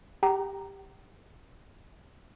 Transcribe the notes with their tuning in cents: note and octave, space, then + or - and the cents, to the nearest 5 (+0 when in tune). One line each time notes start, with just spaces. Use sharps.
G4 +10 G5 -45 A#5 +0